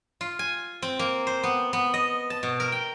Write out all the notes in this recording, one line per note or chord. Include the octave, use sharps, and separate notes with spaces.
F4
G#5
C4
A#3
C5
B3
B3
D#5
A5
B2
A#4
G5